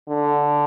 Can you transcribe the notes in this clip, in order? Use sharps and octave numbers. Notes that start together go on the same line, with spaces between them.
D3